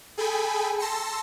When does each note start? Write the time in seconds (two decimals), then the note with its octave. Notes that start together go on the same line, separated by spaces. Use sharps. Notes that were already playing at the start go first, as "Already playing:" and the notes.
0.17 G#4 A4 G5 G#5 B5
0.79 A5 C6 E6 A#6 C#7